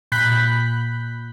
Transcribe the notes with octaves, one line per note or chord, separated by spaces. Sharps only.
A#2 B5 F#6 G6 B6